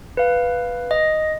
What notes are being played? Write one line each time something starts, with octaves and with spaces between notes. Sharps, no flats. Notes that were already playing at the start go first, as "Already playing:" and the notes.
B4 F5
D#5